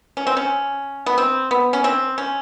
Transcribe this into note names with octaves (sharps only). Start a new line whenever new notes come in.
C#4
C4
C#4
B3
C4
B3
C#4
C4
C#4